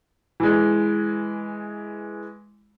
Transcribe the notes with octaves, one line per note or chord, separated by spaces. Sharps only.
E3 G#3